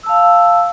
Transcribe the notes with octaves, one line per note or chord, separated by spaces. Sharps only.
F5 A5 E6